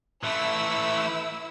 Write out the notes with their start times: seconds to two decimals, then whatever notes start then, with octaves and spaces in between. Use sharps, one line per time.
0.23 E3 A3 E4 E6